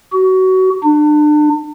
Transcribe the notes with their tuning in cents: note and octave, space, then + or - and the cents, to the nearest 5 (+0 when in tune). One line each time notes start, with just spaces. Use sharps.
F#4 +25
D4 +35